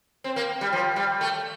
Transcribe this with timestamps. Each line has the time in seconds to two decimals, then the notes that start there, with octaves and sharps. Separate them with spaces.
0.24 C4
0.36 A#3
0.61 G3
0.72 F3
0.96 G3
1.21 A3